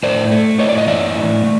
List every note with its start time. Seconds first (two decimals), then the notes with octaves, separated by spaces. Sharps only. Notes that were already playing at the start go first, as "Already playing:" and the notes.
0.03 A2 C5 D5
0.31 A3
0.59 A2 C#5 D#5
0.69 D5
0.78 D#5
0.87 E3 D5 E5
1.16 A2
1.44 A3